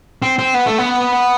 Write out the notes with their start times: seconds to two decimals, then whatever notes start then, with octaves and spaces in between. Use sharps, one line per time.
0.22 C4
0.39 C4
0.54 B3
0.66 A3
0.78 B3